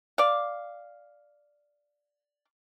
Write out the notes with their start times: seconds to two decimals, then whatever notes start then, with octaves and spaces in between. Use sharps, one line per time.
0.18 D5 F5